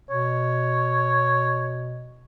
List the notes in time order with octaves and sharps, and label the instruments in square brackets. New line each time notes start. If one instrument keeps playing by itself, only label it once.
[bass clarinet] B2 [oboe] C#5